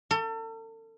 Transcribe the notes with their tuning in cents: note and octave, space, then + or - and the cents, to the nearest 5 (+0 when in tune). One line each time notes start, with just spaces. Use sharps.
A4 +40